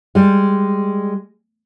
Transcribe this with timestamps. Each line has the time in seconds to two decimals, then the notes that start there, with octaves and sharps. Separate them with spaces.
0.15 G3 G#3